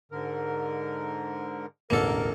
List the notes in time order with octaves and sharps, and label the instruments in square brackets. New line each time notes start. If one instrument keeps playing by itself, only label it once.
[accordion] G#2 D3 A#4
[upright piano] E1 A1 D2 [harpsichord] A#3 A4 [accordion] A#4